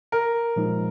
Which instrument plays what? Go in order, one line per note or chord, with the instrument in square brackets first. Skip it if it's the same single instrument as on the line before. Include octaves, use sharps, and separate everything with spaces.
[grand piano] A#4
[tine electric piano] A#2 F3 G#3 D#4